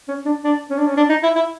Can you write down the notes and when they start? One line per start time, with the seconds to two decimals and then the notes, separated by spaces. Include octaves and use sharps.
0.08 C#4
0.26 D4
0.44 D4
0.70 C#4
0.78 D4
0.87 C#4
0.97 D4
1.10 D#4
1.23 E4
1.36 E4